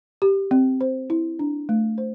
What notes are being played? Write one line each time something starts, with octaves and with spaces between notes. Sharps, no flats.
G4
C4
C5
E4
D4
A3
C5